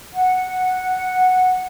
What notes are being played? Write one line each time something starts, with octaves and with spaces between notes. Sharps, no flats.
F#5